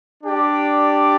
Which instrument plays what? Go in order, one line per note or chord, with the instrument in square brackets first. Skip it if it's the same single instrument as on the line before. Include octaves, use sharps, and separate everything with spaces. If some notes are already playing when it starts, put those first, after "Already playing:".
[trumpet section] D4 G4 D5